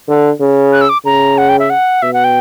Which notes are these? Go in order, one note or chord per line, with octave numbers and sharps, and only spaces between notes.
D3
C#3
F#6
E6
D6
C#3 A#5
F#5
G5
E5
F#5
B2 E5
F#5
G5